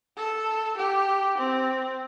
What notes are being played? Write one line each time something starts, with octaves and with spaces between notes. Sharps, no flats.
A4
G4
C4